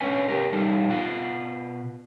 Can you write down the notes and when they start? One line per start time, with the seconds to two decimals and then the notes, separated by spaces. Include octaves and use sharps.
0.01 G#2 D3 C#4 B4 C#5 G#5
0.28 G#2 G4 A#4
0.53 E3 G3 D#4 A4
0.89 B2 F4 F#5